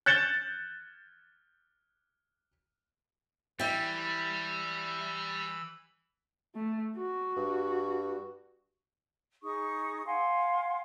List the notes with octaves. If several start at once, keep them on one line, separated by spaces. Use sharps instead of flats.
F#6 G6 A6 C#7 E7 G7
E3 G3 E4 G5 B5 E6
A3
F#4
G2
D#4 G#4 C#6 D#6
F5 F#5 G#5 C6